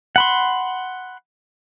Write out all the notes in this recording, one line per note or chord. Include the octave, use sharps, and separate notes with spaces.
F#5 B5 C6